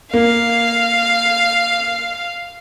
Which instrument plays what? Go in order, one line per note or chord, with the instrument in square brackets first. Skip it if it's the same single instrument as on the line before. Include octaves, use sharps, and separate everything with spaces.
[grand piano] A#3 [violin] F5